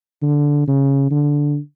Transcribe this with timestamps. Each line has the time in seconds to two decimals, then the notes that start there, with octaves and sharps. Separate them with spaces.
0.22 D3
0.67 C#3
1.11 D3